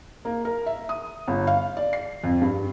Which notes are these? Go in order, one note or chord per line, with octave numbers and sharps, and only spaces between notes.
A#3
A#4
E5
D#6
G1
F5
D5
C7
F2
G2